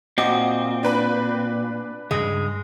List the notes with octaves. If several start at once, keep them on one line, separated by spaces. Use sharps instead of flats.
A#2 C4 F#4 D#5 D6
D4 B4 B5
C#2 G2 G#3